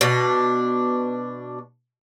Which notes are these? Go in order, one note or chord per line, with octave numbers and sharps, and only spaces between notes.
B2 D4